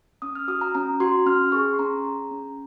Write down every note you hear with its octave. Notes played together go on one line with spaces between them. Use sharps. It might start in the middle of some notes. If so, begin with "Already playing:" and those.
C#4 D#6
F6
F#4 D#6
A#5
C#4 A#5
F#4 C6
C#4 F6
G#4 C#6
C6
C#4 A#5
G#4 A#5
C#4